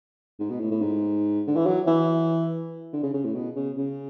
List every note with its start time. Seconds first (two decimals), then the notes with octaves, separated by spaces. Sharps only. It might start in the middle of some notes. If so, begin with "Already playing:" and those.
0.39 G#2
0.50 B2
0.60 A2
0.71 A2
0.82 G#2
1.47 D3
1.56 E3
1.66 F#3
1.87 E3
2.93 D3
3.03 C#3
3.14 C#3
3.25 A2
3.35 B2
3.56 C#3
3.77 C#3